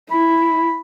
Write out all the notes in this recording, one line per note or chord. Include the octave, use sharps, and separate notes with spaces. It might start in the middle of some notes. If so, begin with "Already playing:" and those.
E4 B5